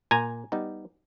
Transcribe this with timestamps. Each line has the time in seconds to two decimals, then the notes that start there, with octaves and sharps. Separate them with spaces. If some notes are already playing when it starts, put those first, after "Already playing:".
0.11 A#2 G#5 A#5
0.52 G3 B3 D#4